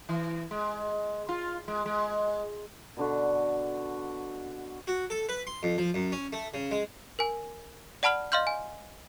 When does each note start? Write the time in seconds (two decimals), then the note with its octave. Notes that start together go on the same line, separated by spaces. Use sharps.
0.09 E3
0.51 G#3
1.29 F4
1.68 G#3
1.86 G#3
2.97 B2 D3 F#4
4.88 F#4
5.10 A4
5.29 B4
5.47 C6
5.63 F2
5.78 F3
5.94 F#2
6.12 C#4
6.33 A3
6.54 C#3
6.71 G#3
7.19 A#4 G#5
8.03 D5 F#5 A5 B5 F6 F#7
8.32 D#5 F5 C6 F6 G6
8.47 G#5